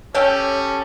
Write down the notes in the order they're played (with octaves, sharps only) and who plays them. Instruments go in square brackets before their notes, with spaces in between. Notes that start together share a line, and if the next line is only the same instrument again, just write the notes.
[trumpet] C#4 [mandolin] G4 A4 [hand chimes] C#5